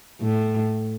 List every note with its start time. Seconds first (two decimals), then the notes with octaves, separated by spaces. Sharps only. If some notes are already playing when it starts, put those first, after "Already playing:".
0.21 A2